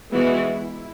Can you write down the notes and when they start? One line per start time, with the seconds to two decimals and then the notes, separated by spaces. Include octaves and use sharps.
0.12 E3 G#3 B3 E4 F#4
0.47 E4